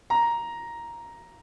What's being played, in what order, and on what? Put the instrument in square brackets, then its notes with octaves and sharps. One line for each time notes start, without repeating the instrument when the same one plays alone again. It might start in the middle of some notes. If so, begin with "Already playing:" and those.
[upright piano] A#5